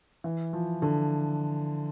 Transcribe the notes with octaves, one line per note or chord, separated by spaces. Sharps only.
E3
F3
D3